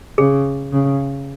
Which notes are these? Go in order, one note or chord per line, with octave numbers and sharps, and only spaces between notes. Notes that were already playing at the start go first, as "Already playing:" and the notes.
C#3 G#4
C#3